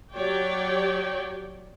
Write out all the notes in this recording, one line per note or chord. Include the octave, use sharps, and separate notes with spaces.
F#3 G4 C#5 D5 G5